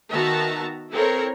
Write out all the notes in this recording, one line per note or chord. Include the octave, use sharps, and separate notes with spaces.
D#3 B3 F#4 E5 A5 A#5
C4 E4 A4 A#4 C#5